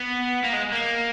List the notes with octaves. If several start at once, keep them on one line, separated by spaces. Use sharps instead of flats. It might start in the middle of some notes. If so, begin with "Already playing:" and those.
Already playing: B3
A#3
G#3
A#3